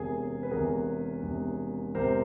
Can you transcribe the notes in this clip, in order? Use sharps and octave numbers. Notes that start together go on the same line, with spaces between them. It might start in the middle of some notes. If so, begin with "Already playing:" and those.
Already playing: E1 E2 C3 G#4 A#4
B4
E1 E2 C3 G#4 A#4
E1 E2 C3
E1 E2 C3 A#4 C5